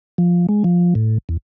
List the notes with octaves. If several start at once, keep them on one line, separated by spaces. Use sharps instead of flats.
F3
G#3
F3
A2
E2